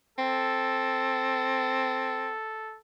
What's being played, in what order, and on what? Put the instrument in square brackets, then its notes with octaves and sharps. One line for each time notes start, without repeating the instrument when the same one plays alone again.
[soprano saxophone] C4 [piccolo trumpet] A4